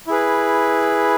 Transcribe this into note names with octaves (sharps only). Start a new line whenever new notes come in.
E4 G#4 B4